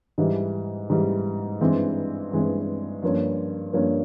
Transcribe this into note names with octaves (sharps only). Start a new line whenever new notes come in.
G#2 E3 G3
G#2 E3 G3
G2 E3 G#3 C4
G2 E3 G#3 C4
G2 F3 A#3 C#4
G2 F3 A#3 C#4